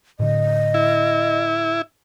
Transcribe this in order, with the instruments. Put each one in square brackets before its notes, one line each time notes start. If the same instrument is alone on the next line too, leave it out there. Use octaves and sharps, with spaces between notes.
[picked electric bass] A2 D3 [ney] D#5
[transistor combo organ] E4